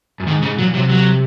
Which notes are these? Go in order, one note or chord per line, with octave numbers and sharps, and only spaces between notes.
F#2
G#2 D#3
G#2 C#3
A#2 F#3
C3 F#3
F#3